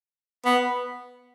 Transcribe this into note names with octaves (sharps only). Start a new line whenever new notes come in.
B3